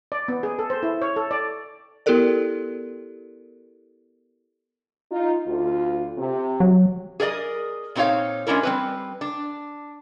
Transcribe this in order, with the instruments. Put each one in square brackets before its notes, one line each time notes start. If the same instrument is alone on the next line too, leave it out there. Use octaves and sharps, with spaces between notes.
[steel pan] D5
B3
G#4
A4
C5
E4
C#5
A4
D5
[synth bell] B3 E4 G4 A4 A#4 D5
[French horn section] D#4 F4
D2 F4
C3
[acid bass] F#3
[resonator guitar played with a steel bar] G#4 A#4 D5 D#5
A#2 C4 D#4 F4 C#5 F5
G#3 C#4 D4 E4 A#4
G3 C4 B4
D4